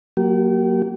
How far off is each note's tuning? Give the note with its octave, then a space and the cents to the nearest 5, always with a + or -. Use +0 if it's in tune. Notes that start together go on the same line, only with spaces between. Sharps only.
F#3 +0 A#3 +0 G4 -35